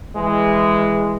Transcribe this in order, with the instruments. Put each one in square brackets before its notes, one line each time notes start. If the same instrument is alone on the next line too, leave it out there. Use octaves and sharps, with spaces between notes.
[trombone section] E3 G#3